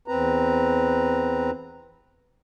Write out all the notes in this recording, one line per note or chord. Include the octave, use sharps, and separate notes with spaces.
E2 C4 B4 A#5